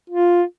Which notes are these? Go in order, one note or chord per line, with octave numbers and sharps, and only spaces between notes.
F4